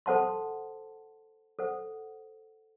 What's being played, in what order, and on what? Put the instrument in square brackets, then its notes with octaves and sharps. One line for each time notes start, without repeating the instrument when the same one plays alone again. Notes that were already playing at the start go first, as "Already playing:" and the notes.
[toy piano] A4 C5 F#5 A5 C6
A4 C5 F#5